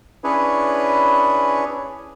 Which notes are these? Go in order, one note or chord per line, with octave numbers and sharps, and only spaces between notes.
C#4 D4 E4 G#4 B4 C#5